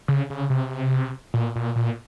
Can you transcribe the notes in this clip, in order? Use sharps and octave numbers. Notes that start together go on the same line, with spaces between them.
C#3
C#3
C3
A#2
A#2
A#2